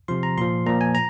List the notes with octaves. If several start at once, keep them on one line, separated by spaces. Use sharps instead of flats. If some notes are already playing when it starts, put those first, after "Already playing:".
C3 F3 C6
A#5
A#2 F3 C6
A#2 F3 A#5
G#5
A#5